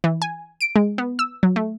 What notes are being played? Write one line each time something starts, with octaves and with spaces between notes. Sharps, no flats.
E3
G#5
D7
G#3
B3
E6
F#3
A3